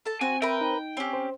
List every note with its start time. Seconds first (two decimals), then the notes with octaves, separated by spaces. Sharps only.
0.06 A4 A5
0.21 C4 F#4 G#5
0.42 A#4 B4 E5 G5
0.61 D#4
0.97 C4 C#4 G4
1.13 C5